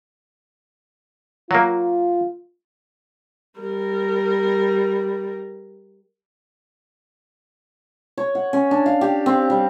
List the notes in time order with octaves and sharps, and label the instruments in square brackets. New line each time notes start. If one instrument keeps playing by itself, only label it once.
[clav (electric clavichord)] F#3 A#3 [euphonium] F4
[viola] G3 A#4
[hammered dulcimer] C#5
F#5
C#4
D4
F5
G4
C4
G3